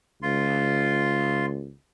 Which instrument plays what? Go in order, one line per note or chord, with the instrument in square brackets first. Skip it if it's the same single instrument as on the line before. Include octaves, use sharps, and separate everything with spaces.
[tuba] C#2 [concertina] F4 C6